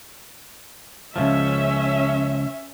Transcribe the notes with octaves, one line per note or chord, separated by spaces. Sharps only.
C#2 F#2 F3 C#4 E5